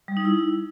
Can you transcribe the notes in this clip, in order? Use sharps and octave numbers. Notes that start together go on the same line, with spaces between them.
G3
D#4
E4